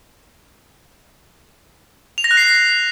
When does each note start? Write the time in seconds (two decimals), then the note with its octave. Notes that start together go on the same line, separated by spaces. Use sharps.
2.18 F7
2.24 A#6
2.31 F#6
2.37 C7